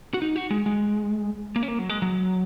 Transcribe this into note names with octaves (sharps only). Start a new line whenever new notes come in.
F#4
D#4
F#4
G#3
G#3
A#3
C#4
A#3
F#3
G#3
F#3